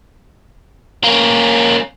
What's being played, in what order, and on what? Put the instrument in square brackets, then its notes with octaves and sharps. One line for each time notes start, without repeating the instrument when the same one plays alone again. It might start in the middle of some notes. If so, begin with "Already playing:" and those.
[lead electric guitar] A#3 C#4